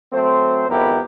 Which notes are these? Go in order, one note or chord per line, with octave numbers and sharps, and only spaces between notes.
F#3 A3 C4 C5
G#1 F2 B3 E4 G4 A#4